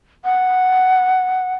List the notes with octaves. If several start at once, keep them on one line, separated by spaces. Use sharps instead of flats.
F#5